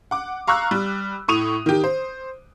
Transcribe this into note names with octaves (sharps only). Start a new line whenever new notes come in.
F#5 D6
F5 A#5 C#6 E6 F#6
G3
A2 C#6 D#6 D#7 F7
D#3 G4
C5